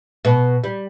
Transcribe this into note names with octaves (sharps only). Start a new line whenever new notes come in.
B2
G3